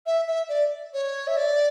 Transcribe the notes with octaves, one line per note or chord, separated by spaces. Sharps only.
E5
E5
D5
C#5
E5
D5